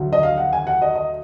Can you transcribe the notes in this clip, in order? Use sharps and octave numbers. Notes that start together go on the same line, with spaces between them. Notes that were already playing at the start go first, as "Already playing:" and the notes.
Already playing: D2 D3 F#3
D#5
F5
F#5
G#5
F#5
D#5
D#5